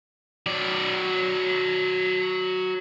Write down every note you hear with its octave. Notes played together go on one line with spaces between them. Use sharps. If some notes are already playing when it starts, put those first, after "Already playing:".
F#3 D5